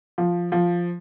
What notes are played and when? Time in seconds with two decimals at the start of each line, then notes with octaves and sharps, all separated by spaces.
0.18 F3
0.52 F3